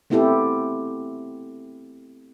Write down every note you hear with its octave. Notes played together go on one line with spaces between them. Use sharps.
A3 B3 C4 E4 G4 A4